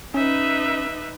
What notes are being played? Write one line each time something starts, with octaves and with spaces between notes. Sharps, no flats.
C#4 D#4 B4 E5